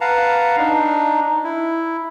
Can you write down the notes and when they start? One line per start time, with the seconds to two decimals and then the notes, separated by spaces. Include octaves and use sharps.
0.01 B4 F5 F#5 A5 A#5
0.58 D4 D#4
1.44 E4